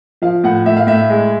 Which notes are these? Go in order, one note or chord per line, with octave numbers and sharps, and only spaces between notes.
F3 F5
A2 F#5
A2 E5
F5
A2 E5
G#3